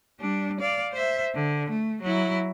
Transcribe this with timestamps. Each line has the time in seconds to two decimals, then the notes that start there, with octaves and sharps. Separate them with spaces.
0.20 G3 D4
0.61 D5 F5
0.93 C5 E5
1.34 D3
1.70 A3
2.02 F#3 E4